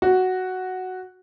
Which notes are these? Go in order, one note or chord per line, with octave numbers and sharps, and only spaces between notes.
F#4